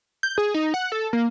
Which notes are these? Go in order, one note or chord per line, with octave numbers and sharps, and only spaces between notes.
G6
G#4
D#4
F#5
A4
A#3